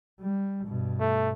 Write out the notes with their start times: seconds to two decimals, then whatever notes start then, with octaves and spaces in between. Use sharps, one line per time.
0.20 G3
0.66 G2 B2
1.00 A3